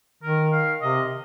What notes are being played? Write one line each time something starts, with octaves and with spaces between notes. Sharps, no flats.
D#3 A#4
F5
C3 D#5